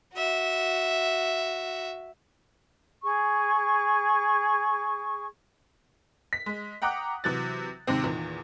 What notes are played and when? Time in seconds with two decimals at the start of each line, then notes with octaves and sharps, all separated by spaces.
0.14 F#4 E5
3.02 G#4 C#6
6.33 B6
6.46 G#3
6.82 F#5 G5 A#5 D6 D#6 F#6
7.24 C3 E3 F#3 F#6 A6
7.87 D#2 G#2 C3 C4
8.03 E2 A#2 D#3